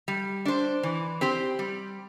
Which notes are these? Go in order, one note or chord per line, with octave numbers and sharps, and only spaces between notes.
G3
D4 C5
E3
C4 G4 C5
G3